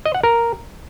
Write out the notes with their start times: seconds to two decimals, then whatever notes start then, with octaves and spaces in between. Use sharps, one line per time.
0.06 D#5
0.15 F#5
0.23 A#4